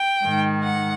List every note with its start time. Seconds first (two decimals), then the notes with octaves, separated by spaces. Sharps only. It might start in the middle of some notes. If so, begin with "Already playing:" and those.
Already playing: G5
0.23 G#2 D#3
0.64 F#5